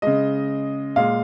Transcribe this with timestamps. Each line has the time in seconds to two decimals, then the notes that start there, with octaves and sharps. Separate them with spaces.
0.02 C#3 G#3 D#5
0.96 A#2 G#3 F5